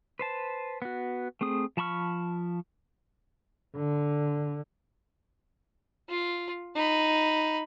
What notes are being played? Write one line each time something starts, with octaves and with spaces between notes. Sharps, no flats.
B4 C5 A5
B3 F#4
A3 C4 G#4 D#6
F3 A5 B5 C#6 F6
D3
F4
D#4 B5